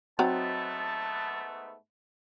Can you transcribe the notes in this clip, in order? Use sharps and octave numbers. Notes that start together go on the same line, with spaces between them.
G#2 F#3 A3 B3 C4 D#4 A5